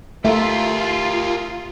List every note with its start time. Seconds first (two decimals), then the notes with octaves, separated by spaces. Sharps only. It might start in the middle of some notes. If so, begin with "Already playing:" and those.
0.25 A3 F4 G4 A#4 E5